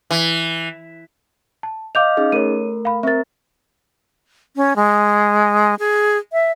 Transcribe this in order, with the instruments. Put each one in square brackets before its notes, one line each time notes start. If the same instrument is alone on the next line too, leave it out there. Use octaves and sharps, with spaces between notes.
[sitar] E3
[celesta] A5
[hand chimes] D#5 F5 [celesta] D6 G6 F7
[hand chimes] C#4 D#4 G#4
[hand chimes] A3 A#4 [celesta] C#5 D#7
[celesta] F5 B5
[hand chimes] C4 A#4 [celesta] E5 A6
[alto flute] C#4
G#3
G#4
E5